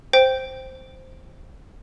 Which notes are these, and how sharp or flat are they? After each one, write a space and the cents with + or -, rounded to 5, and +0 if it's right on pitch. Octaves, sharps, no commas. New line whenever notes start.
C5 +0 G5 +0